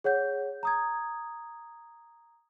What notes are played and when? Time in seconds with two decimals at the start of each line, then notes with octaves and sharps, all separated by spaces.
0.04 G#4 C#5 F#5 G6
0.63 A#5 D#6 G#6